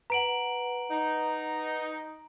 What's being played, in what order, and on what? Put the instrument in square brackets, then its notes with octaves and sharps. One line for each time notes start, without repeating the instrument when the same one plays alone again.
[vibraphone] B4 F#5 [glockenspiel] A#5 D7 F#7
[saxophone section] D#4